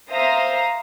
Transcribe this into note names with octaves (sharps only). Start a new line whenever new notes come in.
C5 E5 F5 A#5 D#6 A#6